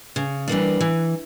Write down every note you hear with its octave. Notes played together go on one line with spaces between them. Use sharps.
C#3
E3 G3 A#3 D4
E3